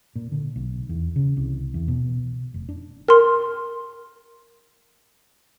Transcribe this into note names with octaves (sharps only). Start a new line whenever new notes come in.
A#2
D3
B1
E2
C#3
C2
E2
B2
F1
D4
A#4 C6